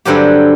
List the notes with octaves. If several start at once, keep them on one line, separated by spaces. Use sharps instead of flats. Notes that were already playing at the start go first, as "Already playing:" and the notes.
G2 D3 F#3 C4 G4